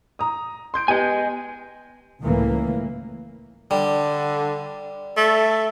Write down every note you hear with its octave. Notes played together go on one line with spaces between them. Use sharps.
A#5 D#6
C6 G6 D7
B3 G4 D#5 G#5
C#2 A2 E3 A#3
D3 G3
A3